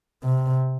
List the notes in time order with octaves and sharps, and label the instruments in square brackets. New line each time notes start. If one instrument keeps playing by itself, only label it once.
[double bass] C3